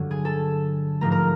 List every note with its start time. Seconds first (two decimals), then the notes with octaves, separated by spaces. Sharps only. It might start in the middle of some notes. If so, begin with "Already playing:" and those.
Already playing: G2 D3 F#3
0.11 G#4 G#5
0.25 A4 A5
1.01 G#2 F3 A3 A#4 A#5
1.12 A#4 A#5